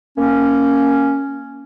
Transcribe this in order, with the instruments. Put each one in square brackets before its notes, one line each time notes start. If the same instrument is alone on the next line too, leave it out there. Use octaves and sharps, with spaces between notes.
[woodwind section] A#3 C#4